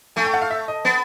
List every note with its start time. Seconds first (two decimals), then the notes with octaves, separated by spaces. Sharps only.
0.16 A3 G#5
0.25 G5
0.34 F#5
0.42 F5
0.51 E5
0.68 D#5
0.85 B3